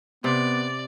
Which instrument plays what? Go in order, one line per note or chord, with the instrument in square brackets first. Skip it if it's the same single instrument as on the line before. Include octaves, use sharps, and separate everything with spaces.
[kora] C3 [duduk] B3 [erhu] D5